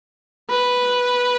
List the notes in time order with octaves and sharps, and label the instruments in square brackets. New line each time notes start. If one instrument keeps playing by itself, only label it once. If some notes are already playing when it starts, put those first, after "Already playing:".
[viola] B4